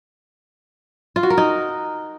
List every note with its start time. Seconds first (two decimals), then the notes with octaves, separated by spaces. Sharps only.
1.16 F4
1.23 F#4
1.30 A#4
1.38 D#4